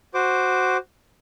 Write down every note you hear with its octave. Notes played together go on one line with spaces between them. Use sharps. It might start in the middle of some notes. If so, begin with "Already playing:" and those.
F#4 C5 D6